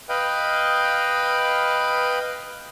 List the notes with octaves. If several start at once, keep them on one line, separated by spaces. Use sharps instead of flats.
B4 D#5 F5 G5